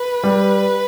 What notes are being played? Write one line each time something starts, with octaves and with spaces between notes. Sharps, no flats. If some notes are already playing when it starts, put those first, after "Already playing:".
Already playing: B4
G3